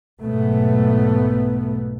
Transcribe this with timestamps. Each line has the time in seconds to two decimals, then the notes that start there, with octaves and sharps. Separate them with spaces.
0.22 B1 G#2 A3 B3